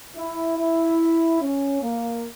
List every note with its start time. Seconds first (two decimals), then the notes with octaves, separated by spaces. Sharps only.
0.17 E4
0.58 E4
1.41 C#4
1.82 A#3